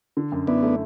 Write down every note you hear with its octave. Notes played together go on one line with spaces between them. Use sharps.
D3
F#2
B3 D4 E4
A3